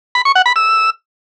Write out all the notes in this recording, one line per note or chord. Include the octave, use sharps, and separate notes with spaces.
B5
C#6
F#5
B5
E6